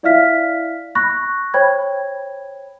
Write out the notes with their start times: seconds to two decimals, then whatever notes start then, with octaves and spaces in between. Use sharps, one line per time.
0.03 E4 D5 E5 F5 F6 B6
0.95 B5 C#6 F#6 A#6
1.54 C5 C#5 G5 B5 G#6